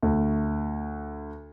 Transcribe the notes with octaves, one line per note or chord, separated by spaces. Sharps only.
D2